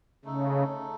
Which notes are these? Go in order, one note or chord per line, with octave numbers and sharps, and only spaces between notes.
C#3 A3 D#4 A4